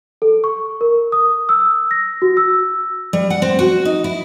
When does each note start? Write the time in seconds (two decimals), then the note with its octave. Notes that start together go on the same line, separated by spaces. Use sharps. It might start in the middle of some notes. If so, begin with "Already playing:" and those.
0.22 A4
0.44 C#6
0.81 A#4
1.12 D#6
1.49 E6
1.91 A#6
2.22 F#4
2.37 E6
3.13 G3
3.30 F#5
3.42 C4
3.59 F#4
3.85 D#4
4.04 E4